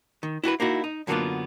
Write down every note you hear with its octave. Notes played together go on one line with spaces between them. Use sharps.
D#3
E4 F#4 A4 B4
A#3 D#4 E4 F#4
D#4
F#2 D3 F#3 A#3 B3 F4